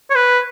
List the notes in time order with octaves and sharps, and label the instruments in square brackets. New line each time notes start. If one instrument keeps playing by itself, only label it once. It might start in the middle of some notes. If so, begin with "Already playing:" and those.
[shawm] C#5
B4